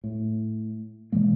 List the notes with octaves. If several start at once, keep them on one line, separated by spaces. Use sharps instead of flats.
A2
B2 E3 G#3 A#3